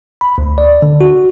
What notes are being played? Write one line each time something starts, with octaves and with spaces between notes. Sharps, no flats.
B5
D2
D5
D3
F#4